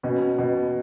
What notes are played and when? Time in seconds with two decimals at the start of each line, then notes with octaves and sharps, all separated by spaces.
0.03 B2 C#4
0.39 B2